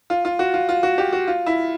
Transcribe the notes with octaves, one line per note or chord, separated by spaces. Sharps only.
F4
F4
F#4
F4
F4
F#4
G4
F#4
F4
E4